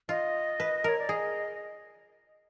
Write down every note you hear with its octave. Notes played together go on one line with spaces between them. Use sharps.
F4 D#5
B4
A#4 C#5
D5
G#4 D#5